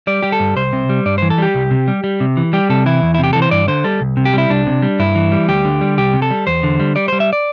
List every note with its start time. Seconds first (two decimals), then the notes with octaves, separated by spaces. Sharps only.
0.07 G3 D5
0.22 G3 G4
0.32 A4
0.40 G2
0.56 C2 C5
0.73 C3
0.89 G3
1.06 G2 D5
1.18 E3 C5
1.30 A4
1.38 G3 G4
1.55 C2
1.71 C3
1.88 G3
2.04 G3
2.20 C3
2.37 E3
2.53 G3 G4
2.69 C3 A4
2.86 E3 E4
3.02 E2
3.14 E4
3.19 C3 G4
3.33 E3 A4
3.42 C5
3.51 G2 D5
3.68 D3 C5
3.84 G3 A4
4.01 C2
4.17 C3
4.25 G4
4.33 G3 E4
4.50 C2 D4
4.67 C3
4.82 G3
4.99 G2 E4
5.16 E3
5.32 G3
5.48 D2 G4
5.65 D3
5.81 G3
5.98 C2 G4
6.13 C3
6.22 A4
6.31 G3
6.47 E2 C5
6.63 D3
6.80 G3
6.96 G3 D5
7.08 G3 C5
7.20 E5
7.33 D5